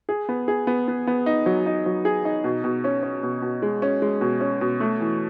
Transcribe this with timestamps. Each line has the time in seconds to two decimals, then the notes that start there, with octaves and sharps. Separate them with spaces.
0.09 G#4
0.29 B3
0.48 G#4
0.67 B3
0.88 B3
1.07 B3
1.26 D#4
1.46 F#3
1.66 D#4
1.86 F#3
2.05 G#4
2.25 D#4
2.44 B2
2.64 B2
2.84 C#4
3.03 C#4
3.23 B2
3.42 B2
3.62 G#3
3.82 C#4
4.02 G#3
4.21 B2
4.41 C#4
4.61 B2
4.80 A3
5.01 E3